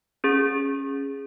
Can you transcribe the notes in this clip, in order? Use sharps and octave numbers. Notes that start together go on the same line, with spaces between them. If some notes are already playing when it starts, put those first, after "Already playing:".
C#4 G#4